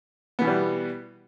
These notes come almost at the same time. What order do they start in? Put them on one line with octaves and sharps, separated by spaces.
B3 E3 B2 G3